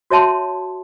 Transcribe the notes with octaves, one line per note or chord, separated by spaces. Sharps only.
F#4 C#5 E5 A5 C6